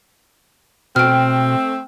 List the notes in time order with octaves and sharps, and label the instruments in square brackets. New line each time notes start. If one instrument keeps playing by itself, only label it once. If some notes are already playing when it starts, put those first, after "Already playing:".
[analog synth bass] B2 [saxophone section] A3 C4 [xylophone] G5 F6